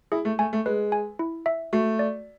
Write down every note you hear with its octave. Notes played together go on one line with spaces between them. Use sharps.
E4 G#4
A3
A3 G#5
A3
G#3 B4
G#5
E4
E5
A3 F#4
D5